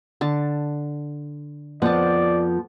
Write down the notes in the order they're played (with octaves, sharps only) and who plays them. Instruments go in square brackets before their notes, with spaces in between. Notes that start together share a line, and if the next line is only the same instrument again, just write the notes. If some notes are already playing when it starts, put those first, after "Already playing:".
[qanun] D3 A5
[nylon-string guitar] F2 F3 B3 [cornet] D5 [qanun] F#5 A5